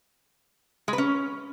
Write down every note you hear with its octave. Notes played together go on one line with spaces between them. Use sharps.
G#3
B4
C#4